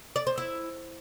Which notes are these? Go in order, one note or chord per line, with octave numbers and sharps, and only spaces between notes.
D5
C5
E4